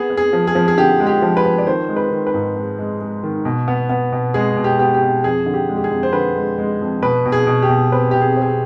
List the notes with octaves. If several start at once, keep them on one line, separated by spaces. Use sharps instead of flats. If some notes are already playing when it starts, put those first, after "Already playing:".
Already playing: B3 G#4
B3
G#4
F3
G#4
F3
G#4
D3 G4
G#3
G4
F3
B4
F3
D5
D#3 C5
G#3
B4
D#3
B4
G#2
G#3
G#3
G#3
D#3
B2
B3
B3
B2
G#3 G#4
B2
G4
B3 G4
G4
B2
F2 G#4
D3
G4
G#3
G4
G#4
F2
C5
D3 B4
G#3
G#3
F2
B2 B4
B2
G#4
B2
G4
B2
C4 B4
B2 G4
G#4
C4
G#4